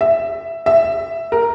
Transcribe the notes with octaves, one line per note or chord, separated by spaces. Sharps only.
E5
E5
A#4